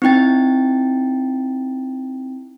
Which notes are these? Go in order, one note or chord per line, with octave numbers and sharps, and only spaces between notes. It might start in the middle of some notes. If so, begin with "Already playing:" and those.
C4 D#4 E4 G5 A6